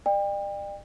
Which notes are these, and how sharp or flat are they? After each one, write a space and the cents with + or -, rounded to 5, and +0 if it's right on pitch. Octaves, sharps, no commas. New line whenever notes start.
D5 +40 G5 +30